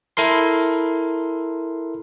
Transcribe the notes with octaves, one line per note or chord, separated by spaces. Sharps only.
E4 A4 A#4 C6